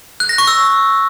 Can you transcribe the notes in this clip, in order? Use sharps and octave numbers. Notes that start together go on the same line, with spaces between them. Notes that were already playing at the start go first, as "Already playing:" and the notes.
F#6
A#6
C#6
E6